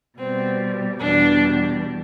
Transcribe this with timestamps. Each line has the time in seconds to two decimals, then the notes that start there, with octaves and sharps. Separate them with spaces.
0.18 B2 G3 C4
1.00 E2 B2 G3 D4